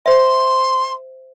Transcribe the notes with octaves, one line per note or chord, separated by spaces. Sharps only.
C5 E5 C6